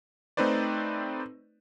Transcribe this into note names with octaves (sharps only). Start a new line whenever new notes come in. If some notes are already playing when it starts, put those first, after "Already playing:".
A3 C4 D#4 B4 C5 D5